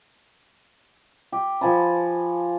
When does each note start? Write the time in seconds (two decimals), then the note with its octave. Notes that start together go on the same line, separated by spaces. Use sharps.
1.32 G4
1.61 F3 G#5 A5 B5